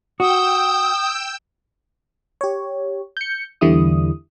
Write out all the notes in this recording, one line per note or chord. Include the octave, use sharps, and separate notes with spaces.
F#4 G5 D#6 E6 G6
G4 C#5
G6 C#7
E2 D3 E3 G3 E4 D#6